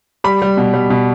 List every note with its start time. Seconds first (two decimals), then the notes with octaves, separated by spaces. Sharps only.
0.24 G3 B5
0.42 G3
0.57 B2
0.74 G3
0.90 B2